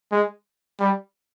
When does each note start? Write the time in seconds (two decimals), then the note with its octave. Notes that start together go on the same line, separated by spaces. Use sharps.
0.11 G#3
0.80 G3